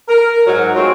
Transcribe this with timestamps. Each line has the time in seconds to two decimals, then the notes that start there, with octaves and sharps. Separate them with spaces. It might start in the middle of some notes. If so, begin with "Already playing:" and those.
0.08 A#4
0.46 G#2 F#3
0.76 G#3 A3 C4 F4 C#5